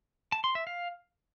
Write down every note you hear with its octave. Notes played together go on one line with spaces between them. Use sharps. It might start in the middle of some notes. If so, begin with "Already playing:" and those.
A5
C6
E5
F5